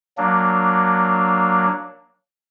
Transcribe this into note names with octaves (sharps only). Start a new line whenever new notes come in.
F#3 A#3 D4